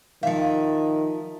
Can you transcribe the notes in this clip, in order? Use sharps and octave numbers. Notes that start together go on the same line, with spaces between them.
D#3 F3 E5 F5